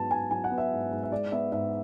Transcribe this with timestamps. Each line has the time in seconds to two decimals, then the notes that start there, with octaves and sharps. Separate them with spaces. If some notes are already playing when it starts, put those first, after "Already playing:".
Already playing: G#2 F#3 B3 A5
0.11 G#2 G#5
0.31 F#3 G#5
0.44 F#5
0.51 B3
0.58 E5
0.72 G#2
0.91 G#2
1.03 E5
1.12 G#3 D5
1.32 B3 E5
1.52 G#2 E5